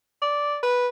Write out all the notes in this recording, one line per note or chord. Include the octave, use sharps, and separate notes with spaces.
D5
B4